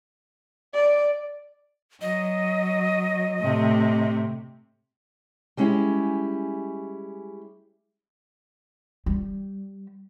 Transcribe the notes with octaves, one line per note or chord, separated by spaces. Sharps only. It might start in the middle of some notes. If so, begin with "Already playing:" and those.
D5
F#3 D#5
A2 C3
G3 G#3 C#4 E4 G4
G3